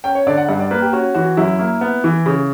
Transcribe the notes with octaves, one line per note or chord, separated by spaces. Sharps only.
C#4 G5
C#5
D3 D5
F#5
G2 F#5
D5
A#3 B4
G4
C#4 F#4
E3 F#4
F#2 E4
A#3
B3
E3
C#3